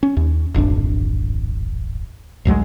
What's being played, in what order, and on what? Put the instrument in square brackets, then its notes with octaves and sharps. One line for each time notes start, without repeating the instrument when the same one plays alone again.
[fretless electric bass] C#4
D#2
D1 G#1 F2 D4
A1 D2 F#3 G#3